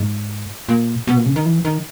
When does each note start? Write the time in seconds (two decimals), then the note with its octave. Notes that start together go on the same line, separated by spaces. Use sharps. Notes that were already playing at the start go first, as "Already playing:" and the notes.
Already playing: G#2
0.69 A#2
1.07 B2
1.17 A#2
1.26 C#3
1.36 D#3
1.46 E3
1.65 D#3